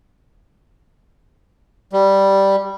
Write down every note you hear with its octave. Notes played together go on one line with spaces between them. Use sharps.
G3